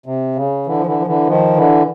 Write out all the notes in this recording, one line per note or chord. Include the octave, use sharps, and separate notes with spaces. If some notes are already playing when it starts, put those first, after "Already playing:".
C3
C#3
D3 E3
F3
D3 E3
F3
D3 E3
D#3 F3
D3 E3